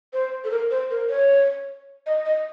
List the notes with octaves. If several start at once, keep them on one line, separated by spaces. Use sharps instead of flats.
C5
A4
A#4
C5
A#4
C#5
D#5
D#5